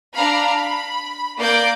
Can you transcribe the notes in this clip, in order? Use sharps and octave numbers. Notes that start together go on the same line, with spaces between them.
D4 F5 A#5 B5
B5
A#3 D5 F5 D6 G6 D7